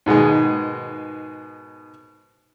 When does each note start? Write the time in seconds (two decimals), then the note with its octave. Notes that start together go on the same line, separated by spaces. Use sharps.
0.06 G#2 B2 D#3 G#3